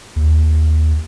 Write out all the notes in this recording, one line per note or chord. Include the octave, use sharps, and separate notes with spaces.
D#2